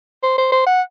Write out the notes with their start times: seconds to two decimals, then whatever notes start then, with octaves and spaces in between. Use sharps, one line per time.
0.23 C5
0.38 C5
0.52 C5
0.67 F#5